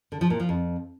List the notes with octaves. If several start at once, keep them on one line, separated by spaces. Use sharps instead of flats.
D3
F3
A#2
F3
F2